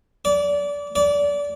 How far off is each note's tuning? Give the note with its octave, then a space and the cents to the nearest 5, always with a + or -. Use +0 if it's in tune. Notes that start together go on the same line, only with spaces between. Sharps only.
D5 -25
D5 -25